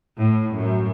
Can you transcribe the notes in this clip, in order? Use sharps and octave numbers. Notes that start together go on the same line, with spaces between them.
A2
F#2